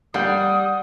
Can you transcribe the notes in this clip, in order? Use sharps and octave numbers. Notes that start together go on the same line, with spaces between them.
G3 F#5 D#6 G6 C7